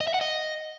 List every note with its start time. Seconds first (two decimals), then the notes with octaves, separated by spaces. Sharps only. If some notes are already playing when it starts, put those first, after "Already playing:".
0.01 D#5
0.07 E5
0.14 F#5
0.21 D#5